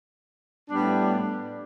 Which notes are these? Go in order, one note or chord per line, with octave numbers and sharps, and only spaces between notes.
A2 G3 B3 D4